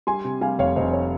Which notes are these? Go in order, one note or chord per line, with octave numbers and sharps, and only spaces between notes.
G3 G#5 C6
C3
G3 F5 G#5
F1 C#5 F5
F1 C5 D#5
C#5